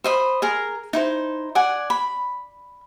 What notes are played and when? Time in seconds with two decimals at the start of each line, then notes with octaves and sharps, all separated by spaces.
0.04 C5 D#5 B5
0.42 G#4 A#4 A#5
0.93 D#4 E4 C5
1.55 D5 F#5 G#5
1.90 B5